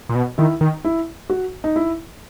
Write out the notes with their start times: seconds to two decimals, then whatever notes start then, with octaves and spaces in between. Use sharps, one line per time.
0.09 A#2
0.15 B2
0.38 D#3 E4
0.61 D#3
0.85 E4
1.30 F#4
1.64 D#4
1.76 E4